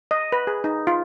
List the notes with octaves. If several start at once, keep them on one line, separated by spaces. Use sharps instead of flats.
D#5
B4
G#4
D#4
F4